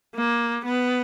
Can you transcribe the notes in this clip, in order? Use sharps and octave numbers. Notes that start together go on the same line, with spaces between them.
A#3
B3